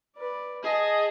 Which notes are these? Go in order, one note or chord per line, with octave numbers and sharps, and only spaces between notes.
B4 D5
G#4 D#5 A5